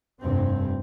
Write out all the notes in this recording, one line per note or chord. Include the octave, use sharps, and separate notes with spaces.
F1 G2 C4